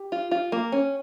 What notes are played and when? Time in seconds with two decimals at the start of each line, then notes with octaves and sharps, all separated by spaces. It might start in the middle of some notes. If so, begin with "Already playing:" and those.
Already playing: G4
0.12 F4
0.31 F4
0.52 A#3
0.72 C#4